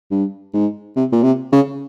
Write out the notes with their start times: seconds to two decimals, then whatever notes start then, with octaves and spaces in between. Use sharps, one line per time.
0.11 G2
0.54 G#2
0.96 C3
1.12 A#2
1.23 C3
1.52 C#3